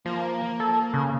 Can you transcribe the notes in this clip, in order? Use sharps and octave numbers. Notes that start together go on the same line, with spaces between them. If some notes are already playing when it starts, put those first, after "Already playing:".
F3 A#3
A4
C#3